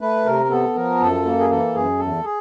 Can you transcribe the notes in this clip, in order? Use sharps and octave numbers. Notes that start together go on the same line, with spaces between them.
A3 B4
C3 A#4
B3 A4
F3 A#4
F#2 A4
A#3
G#4
E3 A4
F#2 G#4
E2 A4
G#4